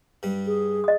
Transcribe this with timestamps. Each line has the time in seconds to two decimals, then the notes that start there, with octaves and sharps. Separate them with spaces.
0.23 G2 G3
0.46 G#4
0.84 D#5 D#6